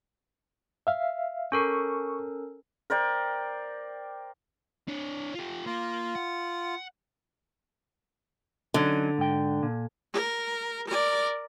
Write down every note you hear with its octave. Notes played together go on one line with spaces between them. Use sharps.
E5 F5
C#4 A4 A#4 C#6
A#4 C5 D5 G5
D4 C#5
F4 G4
A#3 F4
F#5
D3 F#3 C#4 D#4
G#2 G5
A#2
A#4
A#4 D5